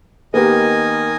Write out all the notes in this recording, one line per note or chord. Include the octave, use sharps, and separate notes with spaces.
D#3 A#3 B3 G4 D#5 G#5